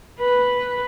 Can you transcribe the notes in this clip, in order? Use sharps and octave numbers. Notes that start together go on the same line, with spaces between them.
B4